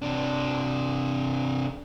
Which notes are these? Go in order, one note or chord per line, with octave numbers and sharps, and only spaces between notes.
C3 D4